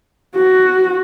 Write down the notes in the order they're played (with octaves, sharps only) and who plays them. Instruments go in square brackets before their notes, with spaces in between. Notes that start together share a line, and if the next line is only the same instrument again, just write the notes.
[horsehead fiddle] F#4